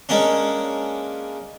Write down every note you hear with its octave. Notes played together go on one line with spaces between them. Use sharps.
G#3 A#3 C#4 D4